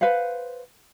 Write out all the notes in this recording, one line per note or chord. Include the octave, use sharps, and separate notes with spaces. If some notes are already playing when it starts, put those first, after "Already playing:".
B4 C5 F5 F#5